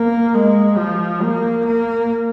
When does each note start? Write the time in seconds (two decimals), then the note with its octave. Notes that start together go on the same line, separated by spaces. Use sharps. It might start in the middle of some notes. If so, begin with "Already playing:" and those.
Already playing: A#3
0.35 G#3
0.78 F3
1.22 A#3
1.66 A#3